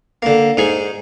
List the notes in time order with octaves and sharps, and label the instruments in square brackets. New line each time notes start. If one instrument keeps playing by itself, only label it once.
[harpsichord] D3 A#3
G#2 D#4 G#4